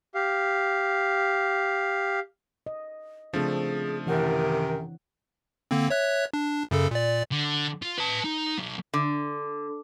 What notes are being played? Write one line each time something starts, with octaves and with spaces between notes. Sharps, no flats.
G4 F5
D#5
C#3 F3 A3 C4 D4 G#4
F#2 C3 D#3 E3 A#4 C#5 F#5
D3 A#3 C4
C#5 E5 F#6
D4
F#2 C#3 A4
A#2 D5
D3
F4
B4 A5
D#4
B1
D3